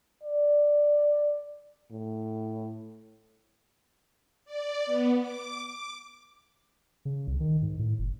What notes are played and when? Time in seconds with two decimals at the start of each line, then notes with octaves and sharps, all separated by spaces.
0.23 D5
1.91 A2
4.45 D5
4.86 B3
5.20 D6
5.69 D6
7.05 C#3
7.27 C2
7.40 D#3
7.62 G#2
7.79 A2
7.99 F#1